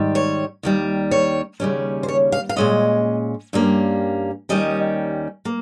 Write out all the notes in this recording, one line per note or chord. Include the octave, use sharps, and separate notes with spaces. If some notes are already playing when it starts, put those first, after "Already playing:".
Already playing: G#2 D#3 G3
C#5
D#2 D#3 G3
C#5
D#2 C#3 G3 C#4
C5
C#5
F5
F5
A#2 G#3 C#4 D#5
G2 G3 A#3 C#4
D#2 D#3 G3 C#4 D#5
A#3